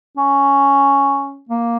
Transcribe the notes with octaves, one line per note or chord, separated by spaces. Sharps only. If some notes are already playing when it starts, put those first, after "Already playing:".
C#4
A#3